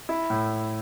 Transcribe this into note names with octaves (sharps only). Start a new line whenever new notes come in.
E4
A2